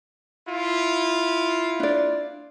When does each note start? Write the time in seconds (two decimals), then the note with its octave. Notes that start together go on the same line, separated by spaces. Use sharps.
0.48 E4 F4
1.80 D4 D5